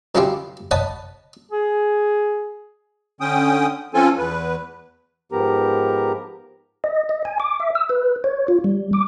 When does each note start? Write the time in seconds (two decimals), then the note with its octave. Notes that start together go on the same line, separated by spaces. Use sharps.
0.15 D#3 F#3 C#4 E4 F4 G4
0.71 C#5 D#5 F#5 A5 B5 D#6
1.51 G#4
3.21 D3 C#4 G5 D#6
3.94 F3 C4 C#4 F4 A4 G#5
4.18 E2 B4
5.32 G#2 F3 B3 G4 A#4 A#5
6.84 D#5
7.09 D#5
7.25 G#5
7.40 D6
7.60 E5
7.75 E6
7.89 B4
8.24 C#5
8.48 F4
8.64 G3
8.93 D6